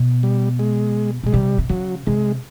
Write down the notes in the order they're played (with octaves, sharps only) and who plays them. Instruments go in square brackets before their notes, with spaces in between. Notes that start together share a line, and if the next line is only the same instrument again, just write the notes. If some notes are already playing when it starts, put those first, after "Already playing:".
Already playing: [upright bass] B2
[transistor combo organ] G3
G#3
[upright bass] B2 [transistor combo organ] G#3
[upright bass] C3 [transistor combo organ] G3
[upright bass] C3
[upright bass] C#3 [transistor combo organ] F#3
[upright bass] C3 [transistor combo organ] G#3